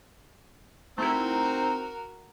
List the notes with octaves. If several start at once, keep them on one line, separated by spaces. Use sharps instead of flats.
A3 C4 D#4 E4 F#4 A#4